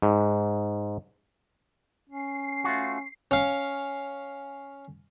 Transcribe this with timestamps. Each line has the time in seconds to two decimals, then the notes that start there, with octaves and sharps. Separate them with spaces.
0.02 G#2
2.09 C#4 C7
2.64 A3 F4 F#4
3.31 C#4 F5